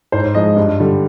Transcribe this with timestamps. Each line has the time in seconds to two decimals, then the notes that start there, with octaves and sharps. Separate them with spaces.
0.12 G#2 C5
0.34 F3 G#3 D#5
0.56 G2
0.80 D3 G3